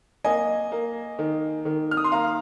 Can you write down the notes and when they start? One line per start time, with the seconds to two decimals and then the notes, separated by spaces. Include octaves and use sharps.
0.24 A#3 D#5 G#5
0.72 A#3
1.19 D#3
1.65 D#3
1.91 F6
1.97 D#6
2.04 C6
2.12 A#3 F5 A#5